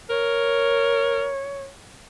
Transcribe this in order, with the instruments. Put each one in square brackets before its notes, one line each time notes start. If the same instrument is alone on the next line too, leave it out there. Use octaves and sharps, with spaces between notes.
[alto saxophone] A#4 [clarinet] C#5